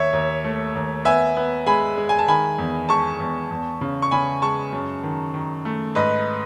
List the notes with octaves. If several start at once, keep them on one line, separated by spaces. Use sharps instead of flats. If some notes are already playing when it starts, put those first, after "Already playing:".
Already playing: D#2 C#5 E5
D#2
A3
D#2
B3 E5 G#5
B3
G#3 G#5 B5
G#3
G#5
A5
D#3 G#5 B5
E2
G#3 A5 C#6
E2
E2
C#3
C#6
C#3 G#5 B5
G#3 A5 C#6
F#2
D#3
D#3
A3
G#2 B4 D#5